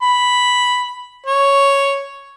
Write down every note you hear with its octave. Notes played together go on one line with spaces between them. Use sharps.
B5
C#5